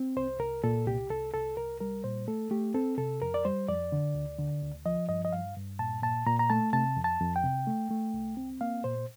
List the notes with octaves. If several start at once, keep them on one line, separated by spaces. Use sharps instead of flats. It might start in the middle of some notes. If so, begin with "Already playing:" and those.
Already playing: C4
C2 C5
C2 A#4
A#2 A4
C2 G4
C2 A4
C2 A4
C2 A#4
G3 A#4
A#2 C5
A3 A4
A3 G4
C4 A4
C3 A4
F2 A#4
D5
G3 C5
F2 D5
D3
D2
D3
D2
F3 D#5
G2 D#5
D#5
G2 F5
G2
A#2 A5
A#2 A5
A#2 A#5
A#5
A3 A5
C3 A5
F2
A5
F2
G5
C3
A3
A3
C2
C4
A#3 F5
A#2 C5